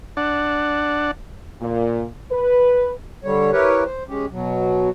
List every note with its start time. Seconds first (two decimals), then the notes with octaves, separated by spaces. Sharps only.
0.17 D4 D5 F#5
1.61 A#2
2.32 B4
3.24 D3 G3 C#5
3.53 E4 G4 A#4 B4 C#5
3.85 C5
4.08 G#3 C#4 G4
4.32 B2 F#3